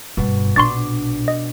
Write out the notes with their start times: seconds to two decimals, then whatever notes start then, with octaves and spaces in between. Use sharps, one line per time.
0.17 F#1 G2 B2
0.56 A#1 D4 C6 C#6 A6
1.28 D#5